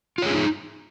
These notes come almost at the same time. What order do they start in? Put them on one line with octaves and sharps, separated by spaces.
F4 C#5 G#4 D4 D#4